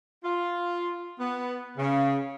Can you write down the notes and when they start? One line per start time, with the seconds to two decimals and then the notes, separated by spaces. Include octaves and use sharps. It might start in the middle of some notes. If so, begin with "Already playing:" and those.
0.24 F4
1.19 B3
1.78 C#3